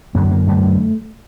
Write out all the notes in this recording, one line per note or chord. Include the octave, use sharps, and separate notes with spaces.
F#2 D3 A#3
A#3
F#2 D3 A3